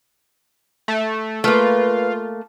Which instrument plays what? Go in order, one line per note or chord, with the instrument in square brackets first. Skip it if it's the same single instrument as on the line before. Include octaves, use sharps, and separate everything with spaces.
[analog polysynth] A3
[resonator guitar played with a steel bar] A3 A#3 [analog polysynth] F4 [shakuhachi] B4